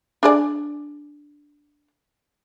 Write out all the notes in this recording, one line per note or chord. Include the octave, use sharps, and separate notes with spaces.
D4 G#4 D5